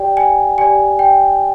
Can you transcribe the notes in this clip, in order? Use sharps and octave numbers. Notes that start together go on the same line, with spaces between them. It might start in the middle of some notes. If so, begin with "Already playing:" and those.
Already playing: G4 D5 G5
G#5
G4 D5 G#5
G5